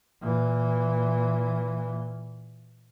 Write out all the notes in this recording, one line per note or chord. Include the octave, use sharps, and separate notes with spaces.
A#2 E3